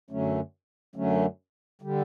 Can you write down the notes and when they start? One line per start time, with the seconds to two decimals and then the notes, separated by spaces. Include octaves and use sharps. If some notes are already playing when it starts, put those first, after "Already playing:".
0.11 F#2 D3 F#3 A3 C#4
0.96 F#2 D3 F#3 A3 C#4
1.82 D3 G3